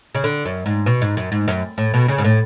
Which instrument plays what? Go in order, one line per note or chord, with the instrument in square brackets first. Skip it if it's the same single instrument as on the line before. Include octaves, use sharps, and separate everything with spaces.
[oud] C#3
D3
F#2
G#2
B2
G#2
F#2
G#2
F#2
A2
B2
C#3
G#2
A2